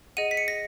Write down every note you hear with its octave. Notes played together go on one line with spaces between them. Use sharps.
G#4 D#5 F#5 D#7
B6
C#7
A#6